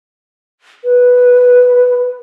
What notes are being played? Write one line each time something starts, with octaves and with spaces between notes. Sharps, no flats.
B4